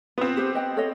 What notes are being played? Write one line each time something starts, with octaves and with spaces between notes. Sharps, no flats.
B3 C4 F4
G4 B4 C5
D#5 G5
A4 C#5 D#5